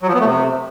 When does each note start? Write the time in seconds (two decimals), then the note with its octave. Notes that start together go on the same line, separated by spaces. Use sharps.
0.02 F#3
0.08 F3
0.14 B3
0.20 A3
0.25 C3